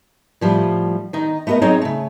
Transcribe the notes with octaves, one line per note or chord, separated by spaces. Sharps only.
A2 F3 G3
D#3 D#4
A3 B3 F#4 A#4 D#5
F#3 C4 D#4 G#4 C#5 D#5
C#3 A3